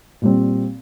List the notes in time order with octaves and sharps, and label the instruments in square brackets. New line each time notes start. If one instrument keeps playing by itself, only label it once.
[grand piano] A#2 G3 C4